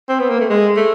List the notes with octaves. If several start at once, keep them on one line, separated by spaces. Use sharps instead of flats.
C4
B3
A#3
A3
G#3
A3